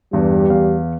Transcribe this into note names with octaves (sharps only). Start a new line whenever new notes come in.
E2 G2 G3
E2 F5